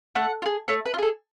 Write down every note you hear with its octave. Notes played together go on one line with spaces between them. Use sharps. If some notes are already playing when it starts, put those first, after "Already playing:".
A3 F#5
F4
G#4
A3 C#5
B4
F4
G#4 A4